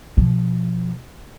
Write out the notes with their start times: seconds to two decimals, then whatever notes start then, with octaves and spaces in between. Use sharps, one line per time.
0.17 B2 F3